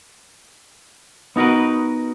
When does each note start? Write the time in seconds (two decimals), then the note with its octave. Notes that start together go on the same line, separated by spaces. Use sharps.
1.36 B3 D#4 F#4 A#4 B4